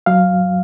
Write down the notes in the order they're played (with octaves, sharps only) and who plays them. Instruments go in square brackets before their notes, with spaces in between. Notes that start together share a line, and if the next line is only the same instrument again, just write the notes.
[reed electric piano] F#3 F5